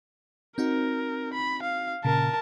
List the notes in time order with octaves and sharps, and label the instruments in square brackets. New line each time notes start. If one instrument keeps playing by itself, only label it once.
[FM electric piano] C4 D#4 F#4 [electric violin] A#4
[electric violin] B5
F5
[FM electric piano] A#2 C#3 [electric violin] A#4 A5